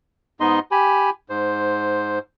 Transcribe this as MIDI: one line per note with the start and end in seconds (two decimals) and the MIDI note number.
0.40 0.59 44
0.40 0.59 59
0.40 0.59 63
0.40 0.59 75
0.40 0.59 84
0.71 1.10 67
0.71 1.10 80
0.71 1.10 83
1.30 2.19 44
1.30 2.19 72